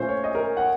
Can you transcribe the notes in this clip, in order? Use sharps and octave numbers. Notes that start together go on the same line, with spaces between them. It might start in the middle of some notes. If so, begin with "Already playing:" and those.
Already playing: A#2 A3 C#4 C5
C#5
D#5
A#4
F#5